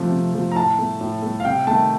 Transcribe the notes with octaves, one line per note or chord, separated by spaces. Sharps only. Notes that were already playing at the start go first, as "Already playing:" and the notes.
Already playing: C3 F3 A3
C3
F3 A3
A#5
A2 A5
A3
A2
A3
F5
C3 G5
D#3 A3 A5